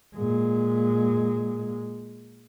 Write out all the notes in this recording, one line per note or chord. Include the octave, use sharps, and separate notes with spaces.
A#2 G#3